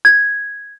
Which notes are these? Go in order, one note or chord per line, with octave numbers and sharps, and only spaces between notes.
G#6